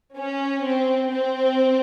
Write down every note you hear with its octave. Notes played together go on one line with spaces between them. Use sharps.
C#4
C4
C4